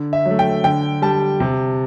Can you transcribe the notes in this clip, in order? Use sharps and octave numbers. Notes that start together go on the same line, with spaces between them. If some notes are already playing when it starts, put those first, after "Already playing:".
Already playing: D3
E5
F#3 A3
G5
D3 G5
G3 A5
C3